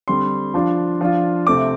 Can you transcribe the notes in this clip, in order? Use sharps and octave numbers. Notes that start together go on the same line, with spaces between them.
D3 G3 C4 C6
F3 D4 F4
F3 D4 F4
C3 A3 C4 D6